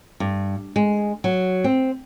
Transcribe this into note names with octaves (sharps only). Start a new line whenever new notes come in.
G2
G#3
F#3
C4